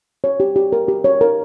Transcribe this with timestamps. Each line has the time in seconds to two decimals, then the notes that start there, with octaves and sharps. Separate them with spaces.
0.24 C#5
0.40 G4
0.56 G4
0.72 A#4
0.88 G4
1.04 C#5
1.21 A#4